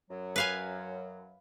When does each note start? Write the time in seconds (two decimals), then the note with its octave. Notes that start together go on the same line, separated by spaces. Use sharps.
0.10 F#2 F#3
0.36 B4 F5 G#5